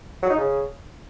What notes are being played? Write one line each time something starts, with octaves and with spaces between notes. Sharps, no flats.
F#3
D#4
C#3